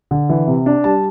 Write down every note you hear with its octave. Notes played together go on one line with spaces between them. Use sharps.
D3
E3
C3
D4
G3 A5